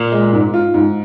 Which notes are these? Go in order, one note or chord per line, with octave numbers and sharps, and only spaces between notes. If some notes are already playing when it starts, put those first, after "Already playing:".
Already playing: A#2
G#3
G#2
F4
G#2